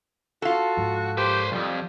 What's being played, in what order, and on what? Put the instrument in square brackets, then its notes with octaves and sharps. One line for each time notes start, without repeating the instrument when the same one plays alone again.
[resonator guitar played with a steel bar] F4 A4 [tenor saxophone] F#4
[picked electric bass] G#2 F3
[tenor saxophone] G4 [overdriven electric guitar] B4 C5
[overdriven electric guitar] C2 F2 [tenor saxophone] G3